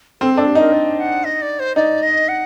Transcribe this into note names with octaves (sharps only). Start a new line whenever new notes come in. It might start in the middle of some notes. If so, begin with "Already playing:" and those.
C4 A4
D4 A4
G4
D#4 A#4
D5
F#5
D#5
D5
C5
D#4 D5
D#5
F#5